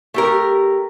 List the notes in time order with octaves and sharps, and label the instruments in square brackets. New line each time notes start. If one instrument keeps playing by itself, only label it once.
[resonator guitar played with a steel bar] A3 G4 A#4